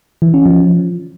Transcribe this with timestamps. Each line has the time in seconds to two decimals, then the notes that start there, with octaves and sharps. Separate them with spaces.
0.22 E3
0.34 C#4
0.46 F3